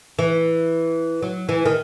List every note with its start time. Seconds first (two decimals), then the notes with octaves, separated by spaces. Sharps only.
0.19 E3
1.22 F#3
1.49 E3
1.65 D#3